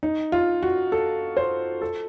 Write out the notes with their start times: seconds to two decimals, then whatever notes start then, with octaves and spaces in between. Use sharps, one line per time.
0.03 D#4
0.32 F4
0.63 F#4
0.92 A4
1.37 C5
1.82 A4